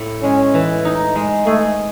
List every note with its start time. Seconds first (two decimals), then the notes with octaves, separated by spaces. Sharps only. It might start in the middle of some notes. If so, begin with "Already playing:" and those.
Already playing: A2
0.23 G#3 C#4
0.54 E3
0.85 D#4
1.16 G#3
1.46 A3 G#4